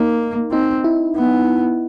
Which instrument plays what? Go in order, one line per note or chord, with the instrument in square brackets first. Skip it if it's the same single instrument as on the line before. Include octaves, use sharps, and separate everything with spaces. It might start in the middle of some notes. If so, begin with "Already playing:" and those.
Already playing: [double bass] A#3 [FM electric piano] D#4
[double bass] C4 [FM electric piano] D#4
[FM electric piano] E4
[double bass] B3